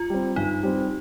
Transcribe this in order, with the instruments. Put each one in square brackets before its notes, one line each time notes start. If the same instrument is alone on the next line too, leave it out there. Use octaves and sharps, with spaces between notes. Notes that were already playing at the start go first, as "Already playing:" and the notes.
Already playing: [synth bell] F4
[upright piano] G3 C4
[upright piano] G2 [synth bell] D#4
[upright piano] G3 C4